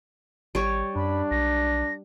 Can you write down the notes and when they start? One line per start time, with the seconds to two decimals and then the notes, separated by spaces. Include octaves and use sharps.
0.55 G#1 G3 C#5
0.96 F#2 D4 B5
1.31 B1 A#6